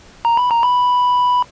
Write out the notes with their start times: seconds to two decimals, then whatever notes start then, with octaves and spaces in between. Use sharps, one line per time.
0.25 A#5
0.37 B5
0.51 A#5
0.63 B5